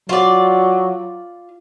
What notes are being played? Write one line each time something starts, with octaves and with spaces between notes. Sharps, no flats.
F#3 F4 D5